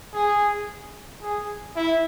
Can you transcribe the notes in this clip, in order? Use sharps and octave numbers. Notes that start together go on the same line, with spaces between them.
G#4
G#4
E4